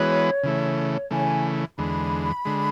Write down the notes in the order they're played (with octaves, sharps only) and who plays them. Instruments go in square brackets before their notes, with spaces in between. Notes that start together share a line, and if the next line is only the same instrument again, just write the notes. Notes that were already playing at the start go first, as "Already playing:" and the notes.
Already playing: [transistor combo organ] E3 G#3 B3 F#4 B4 [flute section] C#5
[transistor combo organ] C#3 E3 A3
[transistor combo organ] C#3 E3 A3 [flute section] G#5
[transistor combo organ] E2 D3 G#3 [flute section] B5
[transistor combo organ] D3 G#3